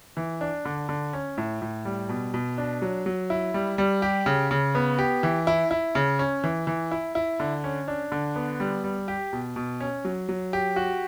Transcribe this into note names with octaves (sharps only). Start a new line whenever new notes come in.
E3
D4
D3
D3
C#4
A2
A2
G3
B2
B2
D4
F#3
F#3
E4
G3
G3
G4
C#3
C#3
B3
G4
E3
E4
E4
C#3
C#4
E3
E3
E4
E4
D3
C#4
D4
D3
B3
G3
G3
G4
B2
B2
C#4
F#3
F#3
G4
F#4